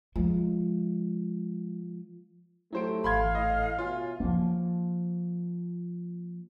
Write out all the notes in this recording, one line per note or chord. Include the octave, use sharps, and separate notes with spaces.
F3 G#3
F#3 A3 E4 G4 C5 D7
G#1 E3 F5 B5 C6 G#6
A2 D#5
B2 F4 C#5 E5 G#5
F3 A#3